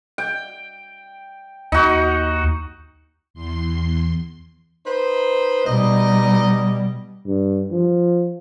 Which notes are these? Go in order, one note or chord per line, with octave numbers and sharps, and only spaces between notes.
G5
D#2 D#4 F#4
E2 C6
D#4 B4 C5
B2 G3 D#4 D#5
G2
F3